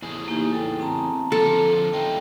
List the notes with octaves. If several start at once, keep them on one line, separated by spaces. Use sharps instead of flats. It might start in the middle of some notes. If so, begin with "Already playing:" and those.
E2 A2 G#4
A#3 D#4 G4
A4 G5 G#5
C4 A5 A#5
D3 F3 F4 A4
E2 D#4 F4 G5